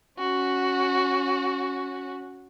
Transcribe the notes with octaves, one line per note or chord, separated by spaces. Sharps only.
C#4 F#4